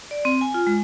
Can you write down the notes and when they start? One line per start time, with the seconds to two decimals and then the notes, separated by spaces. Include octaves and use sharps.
0.11 D5
0.25 C4
0.41 G#5
0.54 F4
0.67 G#3